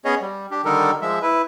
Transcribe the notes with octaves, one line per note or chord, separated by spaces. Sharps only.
B3 C#4 G#4 C#5 D#5
G3
D4 G4
D3 D#3 G3 D#4 A4 A#4
F3 G#3 E5
E4 B4